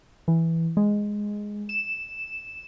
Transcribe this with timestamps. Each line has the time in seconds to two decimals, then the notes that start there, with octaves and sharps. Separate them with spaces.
0.28 E3
0.77 G#3
1.69 E7